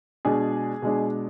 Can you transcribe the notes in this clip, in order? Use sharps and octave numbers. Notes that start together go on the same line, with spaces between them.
B2 G#3 D4 G#4
B2 G#3 D4